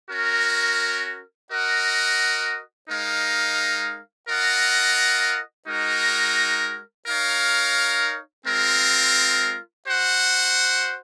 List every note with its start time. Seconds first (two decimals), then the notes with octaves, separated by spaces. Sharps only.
0.10 C#4 F#4 A#4
1.49 F#4 A#4 D#5 F#5
2.88 G#3 D#4 A#4 F5
4.28 F4 A#4 D#5 F#5
5.68 G#3 D#4 F#4 A#4
7.07 D#4 A#4 C#5 F5
8.46 G#3 C4 F4 A#4
9.86 F#4 C5 F#5